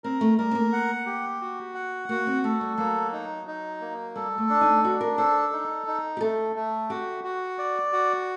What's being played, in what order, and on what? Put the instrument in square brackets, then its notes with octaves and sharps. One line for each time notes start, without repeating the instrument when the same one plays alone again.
[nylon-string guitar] C4 [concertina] A#4
[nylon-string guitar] A3
[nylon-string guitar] G3 [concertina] A#4
[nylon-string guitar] C4
A#3
[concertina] F#5
G4
F#4
F#5
[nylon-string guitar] A#3 [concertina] F#4
[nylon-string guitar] C4
[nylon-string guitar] A3 [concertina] A4
[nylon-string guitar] G3
[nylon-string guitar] F#3 [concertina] A#3
[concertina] D#4
D#4
A#3
[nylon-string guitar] G3 [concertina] A4
[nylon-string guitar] A3
[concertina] D4
[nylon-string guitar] D#4
[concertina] D4 [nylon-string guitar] F#4
[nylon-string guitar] A#4
[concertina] A4 [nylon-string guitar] C5
[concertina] D#4
D#4
[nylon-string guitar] G4
[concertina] A3 [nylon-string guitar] A4
[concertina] A3
[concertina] F#4 [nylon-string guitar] G4
[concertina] F#4
D5
F#4